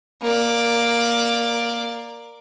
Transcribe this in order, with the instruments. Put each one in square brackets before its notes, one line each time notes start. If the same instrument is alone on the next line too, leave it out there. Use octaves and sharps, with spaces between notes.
[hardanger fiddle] A#3 D5